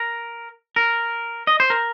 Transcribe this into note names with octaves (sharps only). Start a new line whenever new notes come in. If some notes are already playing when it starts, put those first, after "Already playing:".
Already playing: A#4
A#4
D#5
C5
A#4